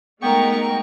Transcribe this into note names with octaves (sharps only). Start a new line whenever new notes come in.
G#3 A3 B3 D#4 A#4 G5 C#6